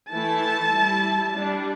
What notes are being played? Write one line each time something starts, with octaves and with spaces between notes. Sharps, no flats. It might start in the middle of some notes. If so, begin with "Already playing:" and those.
E3 A3 E4 A5
G3 E4
G3 D4